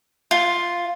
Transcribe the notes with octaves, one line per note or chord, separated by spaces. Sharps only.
F4